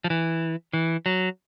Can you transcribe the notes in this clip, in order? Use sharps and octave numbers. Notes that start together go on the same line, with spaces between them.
F3
E3
E3
F#3